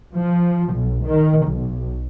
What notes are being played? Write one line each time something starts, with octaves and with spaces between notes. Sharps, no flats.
F3
B1
D#3
B1